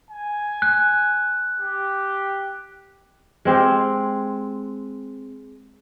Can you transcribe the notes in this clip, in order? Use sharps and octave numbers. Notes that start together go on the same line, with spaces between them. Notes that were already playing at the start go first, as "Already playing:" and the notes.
G#5
F#6
G4
G#3 C4 G4 F5